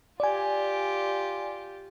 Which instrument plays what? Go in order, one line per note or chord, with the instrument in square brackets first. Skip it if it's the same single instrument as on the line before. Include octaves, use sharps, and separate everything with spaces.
[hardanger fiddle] F4 G4 [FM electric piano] D5 G#5